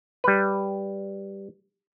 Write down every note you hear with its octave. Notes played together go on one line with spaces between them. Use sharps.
G3 B4